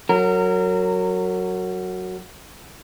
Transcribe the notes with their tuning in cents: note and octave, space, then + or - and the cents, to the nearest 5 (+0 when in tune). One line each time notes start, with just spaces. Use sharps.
F#3 +0 A#4 -30